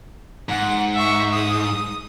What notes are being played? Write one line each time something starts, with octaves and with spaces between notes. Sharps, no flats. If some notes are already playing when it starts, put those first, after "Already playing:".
G#2 F#5
E5 C#6
D#6